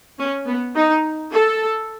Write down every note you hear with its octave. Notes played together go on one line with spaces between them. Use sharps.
C#4
B3
D#4
A4